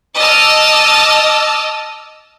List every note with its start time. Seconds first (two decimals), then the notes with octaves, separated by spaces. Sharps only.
0.18 D#5 A5 D6 E6 F6